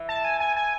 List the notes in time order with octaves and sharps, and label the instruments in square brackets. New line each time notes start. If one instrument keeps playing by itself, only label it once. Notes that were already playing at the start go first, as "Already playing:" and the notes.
Already playing: [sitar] E3
[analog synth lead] A5
G#5
G#5
G#5